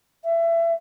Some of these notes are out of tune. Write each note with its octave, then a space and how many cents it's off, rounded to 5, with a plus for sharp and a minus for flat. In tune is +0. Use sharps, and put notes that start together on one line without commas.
E5 +25